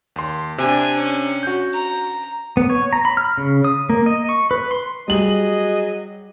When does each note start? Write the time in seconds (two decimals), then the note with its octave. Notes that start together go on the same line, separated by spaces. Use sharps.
0.16 D#2 C6
0.58 C3 D4 G#5
0.96 C#4
1.43 F#4 G6
1.73 A#5
2.57 B3
2.70 C#5
2.93 A#5
3.05 B5
3.17 F6
3.38 C#3
3.64 D#6
3.90 A#3
4.06 D#5
4.29 C#6
4.51 B4
4.71 C6
5.08 F#3 G3 G#4 D#5 F#7